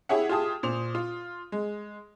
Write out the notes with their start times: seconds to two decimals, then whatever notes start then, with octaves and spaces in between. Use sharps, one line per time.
0.09 E4 G4 G#4 C#5 E5 F#5
0.29 F4 G4 G#4 A5 D#6
0.63 A#2 C5 F7
0.95 F4
1.52 G#3